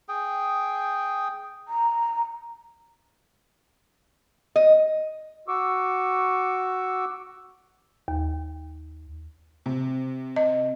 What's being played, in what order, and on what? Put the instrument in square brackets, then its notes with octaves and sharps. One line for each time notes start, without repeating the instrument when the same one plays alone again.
[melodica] G#4 G5
[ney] A#5
[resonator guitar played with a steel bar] D#5
[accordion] F#4 C#6 D6 E6
[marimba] D#2
[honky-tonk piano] C3
[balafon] D#5